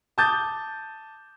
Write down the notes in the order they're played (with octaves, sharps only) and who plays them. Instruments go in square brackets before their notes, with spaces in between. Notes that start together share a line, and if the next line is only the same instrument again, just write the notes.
[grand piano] A5 D6 D#6 G6 A6